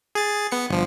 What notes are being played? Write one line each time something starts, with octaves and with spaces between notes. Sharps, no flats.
G#4 A6
B3 C#7
G1 F3